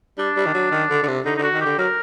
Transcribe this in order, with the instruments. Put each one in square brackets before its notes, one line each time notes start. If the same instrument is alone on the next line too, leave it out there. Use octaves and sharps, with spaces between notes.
[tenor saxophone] G3 [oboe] D4
[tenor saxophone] G3
D#3
F#3
D#3
D3
D3
C3
[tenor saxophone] D3 [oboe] D#4
[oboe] D#4
[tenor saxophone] D3
[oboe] F#4
[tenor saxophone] D#3
[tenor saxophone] D3 [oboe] G4
[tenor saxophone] F#3 [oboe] A#4